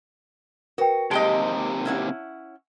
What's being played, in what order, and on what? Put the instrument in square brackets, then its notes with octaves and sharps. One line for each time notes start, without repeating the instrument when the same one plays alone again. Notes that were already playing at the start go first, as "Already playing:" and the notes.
[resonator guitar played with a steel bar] F#4 [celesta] A#4 B4 G5
[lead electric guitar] D#2 C3 [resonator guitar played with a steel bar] G#3 G4 D#5 [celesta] A5 D7 G7
[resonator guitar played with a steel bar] C#4 E4 F#5